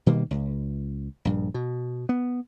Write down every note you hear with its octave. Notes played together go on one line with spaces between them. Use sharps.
B2 D#3 G3 A#3
C#2
A#1 G2
B2
B3